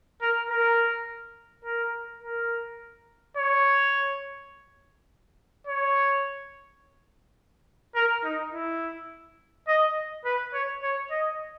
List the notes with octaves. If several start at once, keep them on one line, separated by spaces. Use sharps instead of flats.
A#4
A#4
A#4
A#4
C#5
C#5
A#4
D#4
E4
D#5
B4
C#5
C#5
D#5